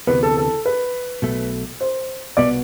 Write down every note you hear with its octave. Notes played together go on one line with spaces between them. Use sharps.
D2 C3 E3 B3 B4
A4
A4
B4
B1 B2 A3
C5
C2 B2 B3 D5